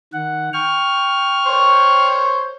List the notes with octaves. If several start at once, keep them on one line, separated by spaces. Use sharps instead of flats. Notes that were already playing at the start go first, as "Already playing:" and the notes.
D#3 F#5
G5 C#6 F6
C5 C#5